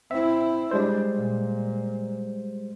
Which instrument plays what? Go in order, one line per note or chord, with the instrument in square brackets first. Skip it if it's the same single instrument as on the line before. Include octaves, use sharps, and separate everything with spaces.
[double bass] C4 E4 [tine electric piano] E5
[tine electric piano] G3 G#3 C5 [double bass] D4
[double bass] A#2